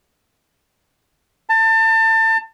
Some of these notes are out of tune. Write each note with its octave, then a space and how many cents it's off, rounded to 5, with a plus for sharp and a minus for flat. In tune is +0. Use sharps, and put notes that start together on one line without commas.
A5 +30